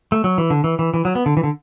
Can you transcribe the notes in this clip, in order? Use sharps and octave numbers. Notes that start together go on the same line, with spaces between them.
A3
F#3
E3
D3
E3
E3
E3
F#3
B3
D3
E3
D3